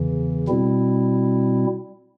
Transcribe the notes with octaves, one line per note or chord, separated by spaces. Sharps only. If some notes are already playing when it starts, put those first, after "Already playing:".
Already playing: E2 C#3 E3
B2 G3 C4 E4